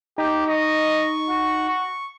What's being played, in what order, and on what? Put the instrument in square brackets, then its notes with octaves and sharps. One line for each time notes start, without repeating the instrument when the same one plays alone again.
[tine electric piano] D#4 [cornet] G4
[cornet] D#5 [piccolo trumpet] C#6
[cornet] F#4
[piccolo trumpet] C#6